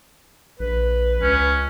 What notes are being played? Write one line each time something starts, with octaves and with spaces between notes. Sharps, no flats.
A#1 B4
C#2 C#4